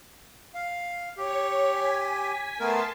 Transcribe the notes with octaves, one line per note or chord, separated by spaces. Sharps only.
F5
G4 C#5
G#5 B6
A3 B3 A#4 A5 C6